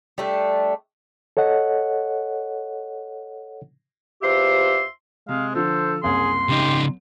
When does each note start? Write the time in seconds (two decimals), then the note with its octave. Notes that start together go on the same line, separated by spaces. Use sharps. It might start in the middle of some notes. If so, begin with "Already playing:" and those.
0.18 G3 A3 D4
1.37 A4 C#5 D#5 F#5
4.22 E2 F4 G4 C5 E5 C6
5.29 C3 G#3 F5
5.55 D3 F3 A4 C5
6.03 F#1 C2 G#4 C6
6.49 C#3 D#4 G4